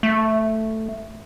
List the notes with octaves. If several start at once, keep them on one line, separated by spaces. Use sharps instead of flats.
A3